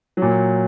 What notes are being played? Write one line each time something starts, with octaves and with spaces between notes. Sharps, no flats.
A#2 F#3